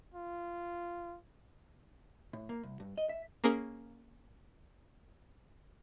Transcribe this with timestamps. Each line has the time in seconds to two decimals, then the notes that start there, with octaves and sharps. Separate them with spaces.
0.14 F4
2.33 A2
2.49 A#3
2.63 C2
2.80 G2
2.98 D#5
3.09 E5
3.44 A#3 C#4 G#4 A#4